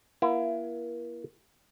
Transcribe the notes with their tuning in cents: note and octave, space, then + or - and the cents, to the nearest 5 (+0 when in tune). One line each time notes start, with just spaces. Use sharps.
A#3 +35 E4 +30